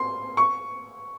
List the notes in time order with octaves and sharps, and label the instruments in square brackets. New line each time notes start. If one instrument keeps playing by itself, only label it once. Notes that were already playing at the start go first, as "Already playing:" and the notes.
Already playing: [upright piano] C6
C#6